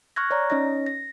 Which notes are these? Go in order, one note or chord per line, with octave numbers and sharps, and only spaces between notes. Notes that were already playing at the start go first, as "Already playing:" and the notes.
C#6 F6 F#6 G#6 A#6
C#5 D5 A#5
C#4 D#4 C#5 D#5 A#6
A#6